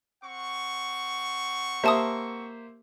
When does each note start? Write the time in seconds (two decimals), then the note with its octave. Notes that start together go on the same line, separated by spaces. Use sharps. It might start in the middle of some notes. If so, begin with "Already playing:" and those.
0.24 C4 F#5 C#6
1.84 A#3 G4 C5 E5 A5 D#6